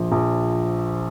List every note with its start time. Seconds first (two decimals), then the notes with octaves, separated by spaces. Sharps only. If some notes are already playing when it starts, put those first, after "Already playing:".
Already playing: A#1 F3
0.12 A#1